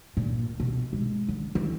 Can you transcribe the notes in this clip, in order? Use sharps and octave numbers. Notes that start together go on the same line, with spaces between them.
A#2
B2
G#3
D3
E3